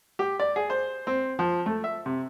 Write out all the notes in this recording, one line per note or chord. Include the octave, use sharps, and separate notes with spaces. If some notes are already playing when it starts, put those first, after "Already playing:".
G4
D5
G#4
C5
C4
F3
A3
E5
C3